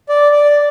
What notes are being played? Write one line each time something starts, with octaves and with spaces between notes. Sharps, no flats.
D5
D5